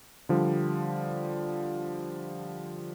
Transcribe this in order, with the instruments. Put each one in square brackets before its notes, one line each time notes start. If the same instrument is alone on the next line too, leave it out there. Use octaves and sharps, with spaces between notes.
[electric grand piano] D3 F3 G3